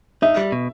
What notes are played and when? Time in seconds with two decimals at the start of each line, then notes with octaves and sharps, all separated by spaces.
0.22 D#4 E5
0.37 G3
0.52 B2